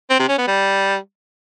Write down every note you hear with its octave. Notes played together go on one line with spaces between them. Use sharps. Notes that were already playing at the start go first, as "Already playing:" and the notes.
C4
C3
C#4
B3
G3